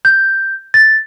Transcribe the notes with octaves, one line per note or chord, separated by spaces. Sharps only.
G6
A6